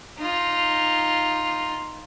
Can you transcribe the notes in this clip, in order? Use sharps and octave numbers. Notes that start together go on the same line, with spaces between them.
D#4 F4